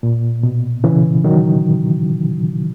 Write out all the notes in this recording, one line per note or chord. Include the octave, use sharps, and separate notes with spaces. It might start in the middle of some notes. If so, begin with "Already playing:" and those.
A#2
B2
C#3 E3
D#3 F#3